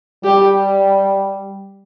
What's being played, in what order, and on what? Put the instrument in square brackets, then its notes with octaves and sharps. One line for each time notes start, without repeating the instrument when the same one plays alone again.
[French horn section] G3 [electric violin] G4